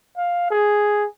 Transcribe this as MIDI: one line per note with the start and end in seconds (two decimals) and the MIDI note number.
0.17 0.47 77
0.50 1.05 68